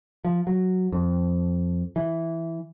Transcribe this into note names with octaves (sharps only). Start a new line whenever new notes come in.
F3
F#3
F2
E3